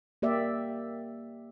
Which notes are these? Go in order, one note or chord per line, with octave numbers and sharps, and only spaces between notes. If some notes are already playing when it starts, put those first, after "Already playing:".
A#3 G4 D5 E5